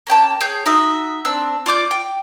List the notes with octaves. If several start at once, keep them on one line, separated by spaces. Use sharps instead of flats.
A#3 C#4 G5 A5
G#4 C#5 G6
D#4 F#4 E5 D#6
C4 D4 E6
F4 D5 D6 G6
G5